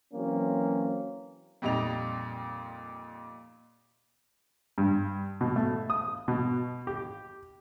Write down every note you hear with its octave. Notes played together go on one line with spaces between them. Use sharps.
E3 F#3 A#3 C4 C#4
F2 A#2 G3 D#4 F7
G2
B2
A3
D#6
B2
G4